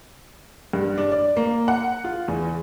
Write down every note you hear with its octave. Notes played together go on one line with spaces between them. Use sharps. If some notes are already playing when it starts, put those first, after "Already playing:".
G2
D4
D5
A#3
F#5
F4
E2